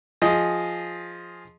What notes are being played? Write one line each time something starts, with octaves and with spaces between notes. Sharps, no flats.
F3 G#4 D#5